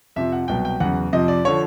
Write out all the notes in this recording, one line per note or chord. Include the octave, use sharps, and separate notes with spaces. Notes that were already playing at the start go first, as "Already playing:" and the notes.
F2 C3 F3 E5
F#5
C2 B2 F#3 G5
G5
E2 C#3 F#3 F#5
F2 C3 F3 D#5
D5
D3 F3 C#5